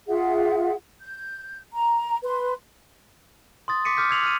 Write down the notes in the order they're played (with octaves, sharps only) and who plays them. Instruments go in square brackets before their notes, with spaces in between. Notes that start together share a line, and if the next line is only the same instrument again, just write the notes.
[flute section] F4 G#4 E5 F#5
G6
A#5
B4 C6
[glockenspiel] C6 D#6 A6
C6 D6 B6 C#7 D#7
D6 F6 G6 B6
E6 G#6 C7 F7 F#7
F6 D#7